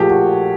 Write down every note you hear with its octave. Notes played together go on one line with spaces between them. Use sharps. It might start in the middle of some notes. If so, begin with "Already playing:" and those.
Already playing: A#1 A#2 F3 A3 G4 G#4
F#4